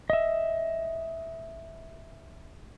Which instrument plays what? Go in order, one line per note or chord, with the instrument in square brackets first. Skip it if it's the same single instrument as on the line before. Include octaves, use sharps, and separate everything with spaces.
[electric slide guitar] D#5 E5